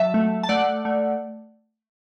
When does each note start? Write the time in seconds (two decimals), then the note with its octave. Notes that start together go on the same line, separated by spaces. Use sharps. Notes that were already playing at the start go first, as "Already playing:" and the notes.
Already playing: F#3 E5 A5
0.14 A3
0.43 A5
0.49 A3 D5 F#5
0.85 A3